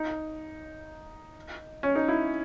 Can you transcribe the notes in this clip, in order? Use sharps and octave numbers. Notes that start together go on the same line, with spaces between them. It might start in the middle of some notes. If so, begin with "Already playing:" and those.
Already playing: D#4
C#4
D#4
E4